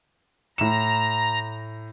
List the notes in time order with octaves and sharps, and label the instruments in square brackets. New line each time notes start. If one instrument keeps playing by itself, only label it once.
[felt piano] A2 E7 [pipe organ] A#5